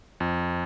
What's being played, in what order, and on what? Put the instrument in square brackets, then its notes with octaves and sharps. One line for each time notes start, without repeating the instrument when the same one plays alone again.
[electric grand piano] F2